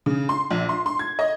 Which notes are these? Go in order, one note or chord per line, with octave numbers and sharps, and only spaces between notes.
C#3
C6
A#1
C6
C6
G#6
D#5